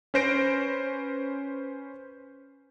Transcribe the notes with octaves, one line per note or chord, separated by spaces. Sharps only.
C#4 B4 C5 A#6 D7